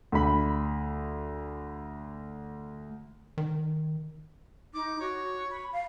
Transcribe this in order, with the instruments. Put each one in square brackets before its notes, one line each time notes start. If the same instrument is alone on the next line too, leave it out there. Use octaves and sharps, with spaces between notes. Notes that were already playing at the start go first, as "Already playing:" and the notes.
[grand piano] D2 B5
[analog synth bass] D#3
[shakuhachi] D#4 [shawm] D6
[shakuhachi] F#4 [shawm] C#5
[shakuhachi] B5
F5